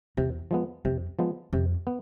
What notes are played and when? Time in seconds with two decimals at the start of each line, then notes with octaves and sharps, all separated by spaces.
0.17 E2 C3
0.51 F3 G#3 B3
0.85 F2 C3
1.19 F3 G#3 B3
1.53 F2 C3
1.87 B3